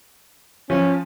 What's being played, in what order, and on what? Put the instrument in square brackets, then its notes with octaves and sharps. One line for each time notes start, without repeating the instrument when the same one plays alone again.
[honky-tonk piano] F3 [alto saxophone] C#4